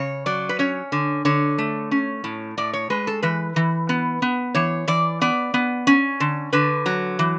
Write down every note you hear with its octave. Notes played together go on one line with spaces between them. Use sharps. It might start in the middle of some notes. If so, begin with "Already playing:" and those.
Already playing: C#3 C#5
F#3 D5
B4
C#4 C#5
D3
D3 C#5
A3
C#4
A2
A2 D5
C#5
G#3 B4
A4
E3 B4
E3
B3
B3
E3 C#5
E3 D5
B3 D5
B3
C#4
D3
D3 B4
F#3
E3